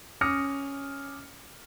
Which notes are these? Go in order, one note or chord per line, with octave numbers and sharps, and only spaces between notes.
C#4 D6 D#6 F6 A#6 C#7